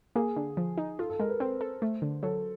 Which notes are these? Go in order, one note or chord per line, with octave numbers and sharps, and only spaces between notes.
A#3 G#4
D3
F3
D#4
F4 A4
A4
G#3 A#4
B4
C4 C5
A4
A3
D3
F#3 A4